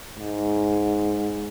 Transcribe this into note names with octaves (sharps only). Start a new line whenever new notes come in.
G#2